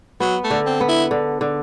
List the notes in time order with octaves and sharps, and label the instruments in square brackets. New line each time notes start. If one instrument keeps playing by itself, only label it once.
[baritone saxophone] F#3 [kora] B3
[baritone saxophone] A3
[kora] D3
[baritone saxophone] C4
[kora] B3
[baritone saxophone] E4
[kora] D3
D3